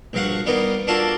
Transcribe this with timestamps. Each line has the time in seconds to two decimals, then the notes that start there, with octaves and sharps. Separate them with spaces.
0.13 A#1 G2 F#3 F5 F#5 C#6
0.46 G3 A#3 B3 D#4 F4
0.87 A#3 D4 F4 F#4 A4 A5